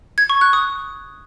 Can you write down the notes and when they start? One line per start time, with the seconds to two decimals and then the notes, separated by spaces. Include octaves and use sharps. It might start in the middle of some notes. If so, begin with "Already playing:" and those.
0.18 G#6
0.30 C#6
0.41 F#6
0.53 D#6